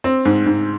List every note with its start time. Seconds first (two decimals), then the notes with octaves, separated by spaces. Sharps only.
0.04 C4
0.25 G#2
0.46 G#2